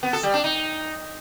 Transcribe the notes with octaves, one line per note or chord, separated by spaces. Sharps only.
B3
A4
G3
D4
D#4